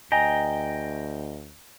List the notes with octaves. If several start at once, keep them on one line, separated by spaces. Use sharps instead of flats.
D2 D#5 G5 G#5 A#5